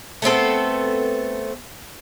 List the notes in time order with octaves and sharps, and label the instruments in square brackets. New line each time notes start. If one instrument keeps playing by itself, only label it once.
[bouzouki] A3 B3 C4 A4